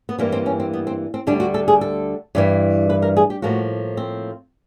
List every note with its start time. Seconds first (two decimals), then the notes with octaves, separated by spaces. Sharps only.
0.09 B3
0.18 G2 E3 G3 A#3 C4
0.32 C4
0.46 C#4
0.60 C4
0.73 B3
0.87 C4
1.14 C4
1.27 D2 D3 G3 D4
1.40 F#4
1.54 A4
1.68 G#4
1.81 A4
2.35 G2 E3 G3
2.90 B4
3.02 A#4
3.17 G#4
3.30 G4
3.42 A2 F3 A#3 F#4
3.97 C4